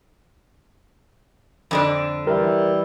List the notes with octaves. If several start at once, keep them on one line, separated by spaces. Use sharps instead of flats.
F2 D3 D4
E3 G3 E4 A#4